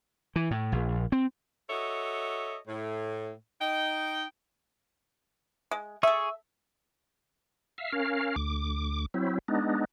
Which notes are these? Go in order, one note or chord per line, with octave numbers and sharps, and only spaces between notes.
E3
A2
A#1
C4
F#4 A4 C#5 D#5 E5
A2
D#4 G5
G#3
G#4 A4 E5 C#6 E6
E5 F5
C#4 A#4 F5
D2 D6
F#3 C4 E4
G#3 B3 D4 D#4